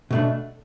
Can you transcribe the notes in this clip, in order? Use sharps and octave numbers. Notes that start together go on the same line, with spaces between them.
B2 A3 D4